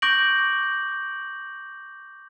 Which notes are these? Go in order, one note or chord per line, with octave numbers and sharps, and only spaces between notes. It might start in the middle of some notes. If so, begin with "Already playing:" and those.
C#6 D6 G6 A#6 D7 F#7